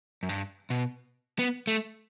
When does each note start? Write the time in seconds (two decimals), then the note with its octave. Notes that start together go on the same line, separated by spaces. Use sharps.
0.23 F#2
0.29 G2
0.70 B2
1.39 B3
1.67 A3